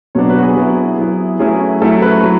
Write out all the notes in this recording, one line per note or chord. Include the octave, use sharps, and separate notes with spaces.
B2 F#3 B3 D4 C#5
B4
F#4
G#4
F#3 B3 E4
F#3 B3 E4
F#3 A3 C#4 E4 G#4
F#3 A3 C#4 E4 A4
B4
F#3